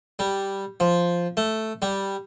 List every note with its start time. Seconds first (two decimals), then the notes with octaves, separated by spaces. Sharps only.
0.19 G3
0.80 F3
1.37 A3
1.82 G3